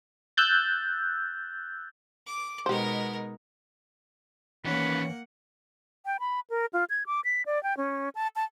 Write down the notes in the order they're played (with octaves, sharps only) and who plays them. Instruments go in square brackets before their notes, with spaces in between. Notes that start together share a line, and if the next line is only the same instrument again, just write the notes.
[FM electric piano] E6 F#6 G6 A6
[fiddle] D6
[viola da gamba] B2 G#3 D#4 [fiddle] B3 A#4 [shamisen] G4 C5
[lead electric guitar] D#3 C#4 [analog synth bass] E3 [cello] A#3 F#5 [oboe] B4
[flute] G5
B5
A#4
F4
G#6
D6
B6
D5
G5
C#4
A5
A5